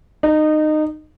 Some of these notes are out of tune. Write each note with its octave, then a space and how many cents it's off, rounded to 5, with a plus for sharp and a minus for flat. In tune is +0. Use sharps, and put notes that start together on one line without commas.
D#4 -20